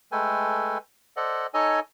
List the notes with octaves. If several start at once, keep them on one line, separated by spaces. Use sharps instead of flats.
G#3 A3 A4 B4 G5 G#5
A4 C5 D5 D#5 F#5
D#4 A4 C#5 D#5 G#5